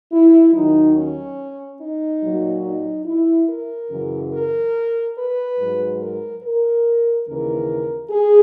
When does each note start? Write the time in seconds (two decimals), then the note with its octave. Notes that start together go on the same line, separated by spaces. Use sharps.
0.12 E4
0.53 D#2 D#3 F#3 D#4
0.96 C#4
1.80 D#4
2.22 A#2 F#3
2.64 D#4
3.06 E4
3.48 A#4
3.90 F#2 C#3 E3
4.32 A#4
5.16 B4
5.58 G#2 F#3
6.00 A#4
6.43 A#4
7.26 D#2 C#3 E3 A#4
8.10 G#4